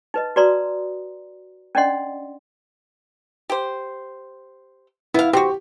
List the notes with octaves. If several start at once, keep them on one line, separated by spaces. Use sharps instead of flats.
D#4 B4 D#5
F#4 B4 D5 A#5 C6 D#6
C#4 D4 D5 D#5 F#5 C6
G4 C5
B3 E4 F5
C4 F#4 G4